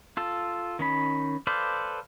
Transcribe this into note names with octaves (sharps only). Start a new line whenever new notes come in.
F4 A4
D#3 C#4 B5
A4 B4 C5 D5 F5